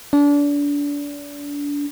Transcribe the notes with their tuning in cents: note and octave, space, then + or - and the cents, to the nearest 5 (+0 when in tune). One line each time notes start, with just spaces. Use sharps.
D4 -30